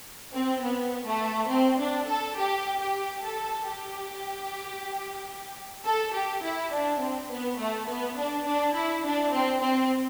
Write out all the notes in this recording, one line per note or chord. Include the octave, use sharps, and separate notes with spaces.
C4
B3
A3
C4
D4
A4
G4
G4
A4
G4
A4
G4
E4
D4
C4
B3
A3
B3
D4
D4
E4
D4
C4
C4